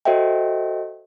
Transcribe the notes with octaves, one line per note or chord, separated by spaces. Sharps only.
F#4 A4 C5 D#5 E5 G5